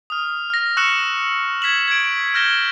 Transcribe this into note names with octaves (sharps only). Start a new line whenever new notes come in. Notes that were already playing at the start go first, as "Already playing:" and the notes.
D#6 F6
F6 A#6
C#6 E6 F#6 A#6 C#7 E7
G#6 B6 E7 F#7
G#6 D7
E6 F6 G6 A#6 E7 G7